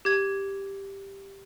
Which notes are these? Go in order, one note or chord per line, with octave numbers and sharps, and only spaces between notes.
G4 G#6